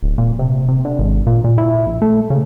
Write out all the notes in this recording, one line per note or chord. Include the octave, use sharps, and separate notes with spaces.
D1
A#2
C3
C3
D3
G#1
A#2
A#2
E4
A#1
A3
C#3